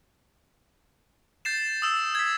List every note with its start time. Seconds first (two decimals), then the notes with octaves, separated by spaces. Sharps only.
1.45 G6 A6 C7 E7
1.82 D#6 E6 E7
2.15 G#6 B6